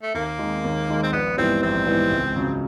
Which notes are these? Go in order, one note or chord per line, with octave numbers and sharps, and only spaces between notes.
A3
D#2 A#3
D#3 G#3
D#2
D#3 G#3
C4
A#1 B3
G#2 E3 G3 B3 C4
A#1 C4
G#2 E3 G3 B3
C#2
C#3 F#3